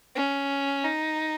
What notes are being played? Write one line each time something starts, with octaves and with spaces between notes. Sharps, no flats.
C#4
D#4